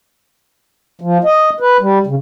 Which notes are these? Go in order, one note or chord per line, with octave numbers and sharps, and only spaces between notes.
F3
D#5
B4
G3
C#3